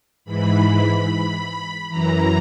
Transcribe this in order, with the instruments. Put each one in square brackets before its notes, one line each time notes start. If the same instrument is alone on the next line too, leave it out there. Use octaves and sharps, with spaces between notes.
[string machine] G#2 E3 B5
F#2 E3 A#5